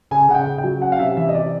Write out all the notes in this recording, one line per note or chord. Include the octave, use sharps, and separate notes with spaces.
C#3 G#5
C#3 F#5
G5
C#3
G5
F#3
C#4 F#5
F5
C3 E5
E3 E5
D#5
C3 D5